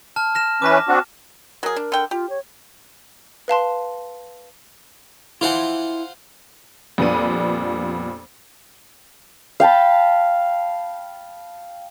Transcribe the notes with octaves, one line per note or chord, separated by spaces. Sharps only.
A5 F6
F6 A#6 E7
E3 C#4 B4 D6 A#6
C4 D4 F#4
F#3 G#4 A#4
D4
D3 G5
F4 G4
C#5
B4 F5 A5 C6
E4 F4 C5 E5 F#5 G#5
F2 A#2 G3 B3 D4 D#7
F5 G5 A5 B5